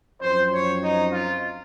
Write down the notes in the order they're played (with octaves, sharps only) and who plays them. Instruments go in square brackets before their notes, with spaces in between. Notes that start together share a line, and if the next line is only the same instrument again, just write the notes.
[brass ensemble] F#2 F3 C4 C5
C#5
D#4
F4